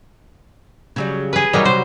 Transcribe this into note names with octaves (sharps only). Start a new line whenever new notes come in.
C#3 F#3 G3
G#4 B4
F#3 G3 D#4 F#4 A#4
C3 F#4 C5